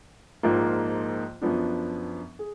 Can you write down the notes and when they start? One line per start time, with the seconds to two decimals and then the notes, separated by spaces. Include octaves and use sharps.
0.43 A#1 G#2 F3 A#3 F4
1.41 F#2 F3 B3 D4
2.39 G#4